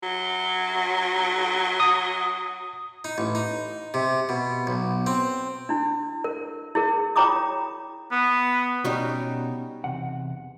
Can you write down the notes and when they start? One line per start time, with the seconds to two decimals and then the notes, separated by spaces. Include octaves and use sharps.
0.03 F#3
1.80 D#6
3.04 D#4
3.18 A1
3.35 D#4
3.94 C3
4.29 B2
4.67 B1
5.07 C4
5.69 D4 E4
6.24 A#4
6.75 E4 G#4 A#4
7.16 F4 C#5 G5 A#5 D6 D#6
8.12 B3
8.84 B2 G3 C#4 D#4 F#4
9.84 E2 C3 F#5